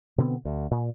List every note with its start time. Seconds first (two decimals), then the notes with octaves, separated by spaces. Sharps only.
0.18 B2 D3 B3 C4
0.45 D2
0.71 A#2